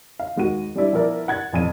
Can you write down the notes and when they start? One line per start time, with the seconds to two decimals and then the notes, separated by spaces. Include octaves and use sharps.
0.19 F5
0.36 D#2 G#3 F#4 D#7
0.76 G3 D4 E4 D5
0.93 F3 B3 E4 A#4 D5
1.28 F#5 G#6 A6
1.53 A1 F2 D#7